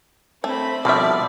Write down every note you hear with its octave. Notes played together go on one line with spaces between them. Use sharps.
A3 C4 B5
B2 F3 G3 A4 D5 E5